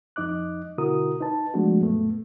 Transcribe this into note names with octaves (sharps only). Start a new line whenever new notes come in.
F2 D#4 D#5 D6 F#6
B2 D3 E4 F#4 A#4 D#6
D#4 B4 A5
F3 G#3 A3 B3 D4 F#4
F#2 A#2 A3 B3